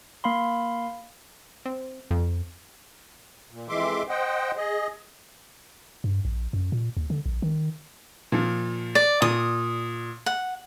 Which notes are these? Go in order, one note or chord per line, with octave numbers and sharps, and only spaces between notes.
A#3 F5 B5 C6
C4
F2
A#2
F2 E3 G#3 E5 C6 D6
C5 D#5 F#5 G5
G#4 D#5
G2
A#1
F#2
A#2
D#2
D3
A#1
D#3
A#2 F3
D5
A#2 D#6
F#5